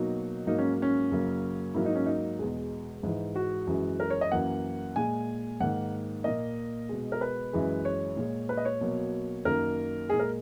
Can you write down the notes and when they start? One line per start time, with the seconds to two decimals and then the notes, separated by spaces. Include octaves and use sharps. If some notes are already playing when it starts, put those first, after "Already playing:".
Already playing: B2 F#3 A#3 D#4
0.47 G#2 F#3 A#3 D#4
0.58 C#4
0.82 C#4
1.12 F#2 C#3 F#3 A#3
1.75 G#2 F#3 A#3 E4
1.86 D#4
1.95 C#4
2.06 D#4
2.39 E2 B2 G#3
3.03 G#2 E3 G#3
3.36 F#4
3.67 F#2 E3 G#3
4.00 A#4
4.10 C#5
4.21 D#5
4.32 F#2 E3 A#3 F#5
4.96 A#2 G#3 G#5
5.60 G#2 D#3 A#3 F#5
6.24 A#2 A#3 D#5
6.89 B2 G#3
7.12 A#4
7.21 B4
7.53 F#2 E3 G#3
7.85 C#5
8.17 A#2 G#3
8.49 B4
8.57 D#5
8.65 C#5
8.81 B2 F#3 A#3
9.45 F#2 D#3 A#3 A#4
10.09 A#2 G#3 G#4
10.19 A#4